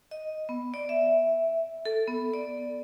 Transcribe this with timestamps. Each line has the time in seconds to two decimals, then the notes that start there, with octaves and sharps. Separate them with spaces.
0.11 D#5
0.49 B3
0.74 D5
0.89 E5
1.85 A4
2.08 B3
2.34 D5